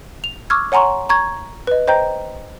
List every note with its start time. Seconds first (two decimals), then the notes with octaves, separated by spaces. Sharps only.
0.24 F7
0.50 C#6 D6 E6 F6 G#6
0.72 C#5 F#5 G#5 A#5 C6 C#6
1.09 A#5 C#6 G#6
1.67 B4 D#5
1.88 C5 D#5 G5 A#5 G6